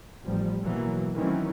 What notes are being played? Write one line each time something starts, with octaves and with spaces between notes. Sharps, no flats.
A1 F3 G3
B2 E3 F#3 A#3
D#3 E3 F#3 A3 C4 C#4